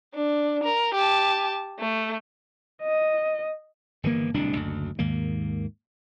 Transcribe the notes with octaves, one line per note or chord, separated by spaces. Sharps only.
D4
A#4
G4 A5
A3
D#5
G1 D#3 E3 A#3
D1 C2 B2 D4
F#1 D2
D#2 G#2 D#3 A#3